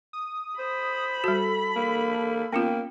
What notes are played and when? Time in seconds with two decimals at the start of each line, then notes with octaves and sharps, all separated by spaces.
0.13 D#6
0.59 C5 B5
1.24 G3 F#4 A4
1.76 A#3
2.52 A#3 B3 C#4 F4 G5